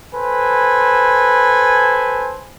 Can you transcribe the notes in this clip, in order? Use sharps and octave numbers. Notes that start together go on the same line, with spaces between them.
A4 B4 C5 G#5